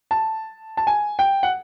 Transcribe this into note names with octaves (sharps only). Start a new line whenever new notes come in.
A5
A5
G#5
G5
F#5